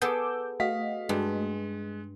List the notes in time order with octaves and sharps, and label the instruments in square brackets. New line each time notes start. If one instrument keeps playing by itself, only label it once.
[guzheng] B3 G#4 A4 [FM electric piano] D6 E6 G6
[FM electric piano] A3 F#4 D#5 [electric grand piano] F5 B6
[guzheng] G2 [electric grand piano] G#3